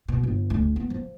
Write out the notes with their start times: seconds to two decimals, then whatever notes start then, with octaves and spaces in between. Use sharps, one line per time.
0.08 B2
0.23 G1
0.50 D2
0.76 B3
0.90 F3